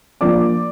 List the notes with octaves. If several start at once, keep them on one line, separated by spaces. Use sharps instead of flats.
F3 A#3 D4 F4 D5 D6